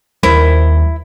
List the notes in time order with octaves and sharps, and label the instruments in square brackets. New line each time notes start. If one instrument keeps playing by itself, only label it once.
[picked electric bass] D#2 G3 [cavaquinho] E4 [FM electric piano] A#4 C5